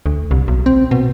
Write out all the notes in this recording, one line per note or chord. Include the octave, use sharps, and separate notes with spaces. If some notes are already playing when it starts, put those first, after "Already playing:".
D2
C2
B1
C4
B2